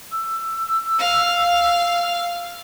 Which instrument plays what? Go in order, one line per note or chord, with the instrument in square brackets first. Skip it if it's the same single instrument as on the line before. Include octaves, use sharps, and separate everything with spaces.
[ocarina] E6
[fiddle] F5